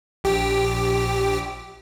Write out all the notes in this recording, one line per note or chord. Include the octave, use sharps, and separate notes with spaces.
A#1 G4